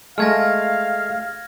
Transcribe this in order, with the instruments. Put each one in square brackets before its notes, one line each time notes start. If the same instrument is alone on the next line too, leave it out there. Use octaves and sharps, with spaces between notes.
[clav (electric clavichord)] G#3 A3 [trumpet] F5 [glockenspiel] F6 G#6 A#6